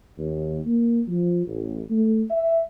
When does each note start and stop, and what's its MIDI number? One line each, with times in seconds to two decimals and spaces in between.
0.18 0.60 39
0.66 1.01 58
1.08 1.44 53
1.47 1.80 33
1.90 2.22 57
2.31 2.60 76